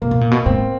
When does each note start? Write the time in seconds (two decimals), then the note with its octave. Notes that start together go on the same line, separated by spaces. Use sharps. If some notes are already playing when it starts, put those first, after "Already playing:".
0.02 C3 A#3
0.11 B2
0.21 A#2
0.31 B2
0.46 G#2 C4